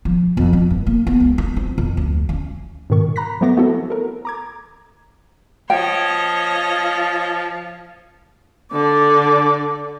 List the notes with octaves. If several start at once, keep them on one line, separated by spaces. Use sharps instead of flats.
F3
F2
C4
G2
A#3
B3
C#2
D#4
C4
F2
D2
C#4
G#2 B2 D#3 C#6
A#5 B5 F#6 A#6 B6
F3 F#3 A3 B3 D6 A#6
A3 B3 C4 E4 F#4 A4
A4 A#4
A#5 D6 G#6
F3 C#5 D#5 G5
D3 D5